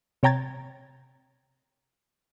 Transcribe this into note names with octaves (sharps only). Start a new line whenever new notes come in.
C3 C#5 G5 A#5 G#6 A6